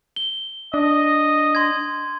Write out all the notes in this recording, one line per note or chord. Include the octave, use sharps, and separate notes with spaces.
G7
D4 D#5
C6 G#6